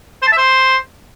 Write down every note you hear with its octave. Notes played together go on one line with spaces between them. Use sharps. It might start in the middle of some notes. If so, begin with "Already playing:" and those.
C5
A5
E5
C5